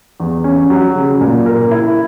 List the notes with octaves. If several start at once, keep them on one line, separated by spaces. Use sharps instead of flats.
E2
C#4
F#3
C#3
A#2
A#4
E4